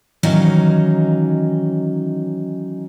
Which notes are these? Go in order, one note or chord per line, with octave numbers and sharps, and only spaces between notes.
D#3 E3 F#3 C#4 D#4 F5